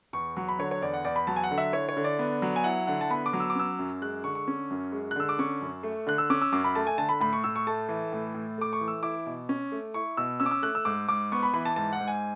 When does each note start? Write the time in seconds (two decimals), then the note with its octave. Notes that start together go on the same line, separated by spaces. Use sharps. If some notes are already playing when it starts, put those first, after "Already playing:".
0.13 E2 C#6
0.36 F#3 C#6
0.48 B5
0.59 D3 C#5
0.71 C#5
0.82 E2 D5
0.94 F#5
1.05 E2 D5
1.16 B5
1.27 F#3 A5
1.36 G#5
1.44 F#5
1.51 D3
1.58 E5
1.73 E4 C#5
1.89 C#5
1.97 D3
2.04 D5
2.19 B3
2.42 F#3
2.56 G#5
2.64 E4 F#5
2.87 D3 F#5
3.01 A5
3.10 B3 B5
3.26 D6
3.33 F#3
3.40 E6
3.50 D6
3.55 C#4 E6
3.79 F#2
4.01 G#3 F#6
4.24 D3 C#6
4.35 C#6
4.48 C#4
4.70 F#2
4.92 G#3
5.11 F#6
5.16 D3 E6
5.29 D6
5.39 C#4 C#6
5.61 F#2
5.83 A3
6.07 D3 F#6
6.18 E6
6.30 C#4 D6
6.42 E6
6.52 F#2 D6
6.64 B5
6.75 A3 A5
6.87 G#5
6.98 D3 A5
7.09 B5
7.20 A2 B5
7.33 C#6
7.44 A2 E6
7.56 C#6
7.67 A3 A5
7.89 E3
8.12 A2
8.34 A2
8.58 A3 D6
8.73 C#6
8.81 E3
8.88 E6
9.03 E4 D6
9.26 B2
9.49 C#4
9.72 A3
9.94 E4 C#6
10.17 B2 E6
10.40 C#4 E6
10.46 D6
10.51 E6
10.62 A3 F#6
10.75 E6
10.85 G#2 D6
11.08 G#2 D6
11.32 B3 C#6
11.43 B5
11.54 E3 B5
11.65 A5
11.76 G#2 A5
11.93 F#5
12.00 G#2
12.08 G#5